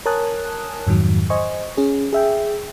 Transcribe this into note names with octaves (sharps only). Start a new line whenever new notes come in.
A#4 C#5 G#5 A5 D#6 F#6
F2 G#2 D#3 F#3
C5 D#5 G#5 C#6
C#4 G#4
G#4 E5 G5